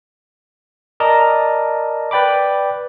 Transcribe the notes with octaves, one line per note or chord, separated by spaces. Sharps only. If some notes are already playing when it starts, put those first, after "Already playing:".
A#4 D5 D#5 A5 A#5
B4 D5 G5 B5 D6